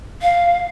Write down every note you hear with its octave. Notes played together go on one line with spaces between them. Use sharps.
F5